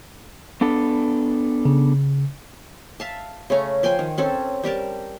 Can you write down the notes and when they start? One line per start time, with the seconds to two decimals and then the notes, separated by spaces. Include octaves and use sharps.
0.61 B3 D4 A4
1.65 C#3
3.00 E5 F5 A5
3.50 C#3 A3 C#4 A#5
3.83 F3 G5 G#5 C6
3.99 D#3
4.18 C4 C#4 A4
4.64 G3 G4 A#4 A5